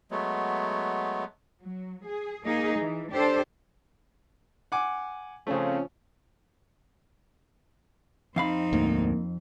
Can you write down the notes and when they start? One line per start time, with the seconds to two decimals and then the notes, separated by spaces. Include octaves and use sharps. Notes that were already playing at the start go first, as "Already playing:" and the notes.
0.11 F#3 G#3 A3 B3
1.61 F#3
2.07 G#4
2.46 A#3 D#4 G#4
2.80 E3
3.12 D4 G4 A4 C5
4.72 F#5 G#5 D6
5.47 C#3 F3 A3 C4 C#4
8.36 F2 C4 D#4 F5 B5
8.73 D2 G#2 A#3